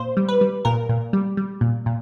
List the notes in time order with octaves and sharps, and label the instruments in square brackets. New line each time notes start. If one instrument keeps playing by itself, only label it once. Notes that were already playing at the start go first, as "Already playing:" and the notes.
Already playing: [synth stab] A#2 C5
G3
B4
G3
A#2 A#4
A#2
G3
G3
A#2
A#2